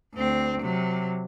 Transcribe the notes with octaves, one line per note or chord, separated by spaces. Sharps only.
D2 C4
C3 F#3